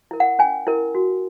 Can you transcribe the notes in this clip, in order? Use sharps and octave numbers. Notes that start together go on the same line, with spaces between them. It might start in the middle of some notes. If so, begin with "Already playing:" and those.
E4 A#4
F#5
C#4 G#5
E4 A#4
F#4